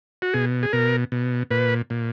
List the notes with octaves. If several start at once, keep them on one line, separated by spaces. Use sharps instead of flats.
F#4
B2 G#4
G#4
B2 A#4
B2
A#2 B4
A#2